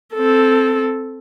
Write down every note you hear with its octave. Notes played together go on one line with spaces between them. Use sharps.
C4 A4